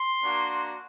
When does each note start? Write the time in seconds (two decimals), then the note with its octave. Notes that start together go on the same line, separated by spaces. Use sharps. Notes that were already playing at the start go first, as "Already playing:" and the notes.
Already playing: C6
0.22 A#3 D4 F#4